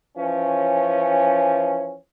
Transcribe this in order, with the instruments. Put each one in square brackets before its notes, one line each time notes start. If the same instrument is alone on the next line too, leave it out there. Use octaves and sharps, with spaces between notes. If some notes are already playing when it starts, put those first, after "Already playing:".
[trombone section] E3 F3 C#4